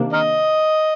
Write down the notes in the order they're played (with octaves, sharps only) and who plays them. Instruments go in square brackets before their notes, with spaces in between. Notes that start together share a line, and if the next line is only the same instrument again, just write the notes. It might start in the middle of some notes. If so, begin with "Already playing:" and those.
Already playing: [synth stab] C3 D#3 A#3 D4
[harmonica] A#4 D#5